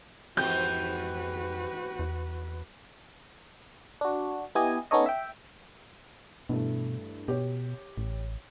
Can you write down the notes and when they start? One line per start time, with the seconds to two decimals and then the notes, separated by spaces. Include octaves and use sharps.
0.37 F2 G#2 E3 F#4 G4 B4 G6
1.99 E2
4.01 D4 F#4
4.55 B3 E4 G4 D#5 G#5
4.91 B3 C#4 D#4 A4 C#5 D#5
5.06 E5 G5
6.49 G2 B2 E3 A3
7.28 B2 G4 C#5
7.98 A1